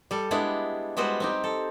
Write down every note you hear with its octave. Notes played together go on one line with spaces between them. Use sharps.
G3 A4
G3 G#3 B3 D4 E4
G3 G#3 B3 F#4 B4 C5
C4 D#4 G4
A4